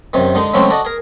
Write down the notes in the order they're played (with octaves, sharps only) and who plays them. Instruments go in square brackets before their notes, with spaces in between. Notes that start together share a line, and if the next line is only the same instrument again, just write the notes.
[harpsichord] F#2 C3 D#3
D3 G#3 D#4
C#3 F#3 G#3 A3 C4 C#4
F#4 A4 D5 D#5
G#4 A#4